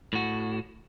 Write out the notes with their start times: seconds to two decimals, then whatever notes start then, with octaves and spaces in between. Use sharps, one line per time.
0.13 A2 F#4